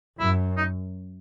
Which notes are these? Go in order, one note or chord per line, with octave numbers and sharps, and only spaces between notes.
F#2 E4
D#4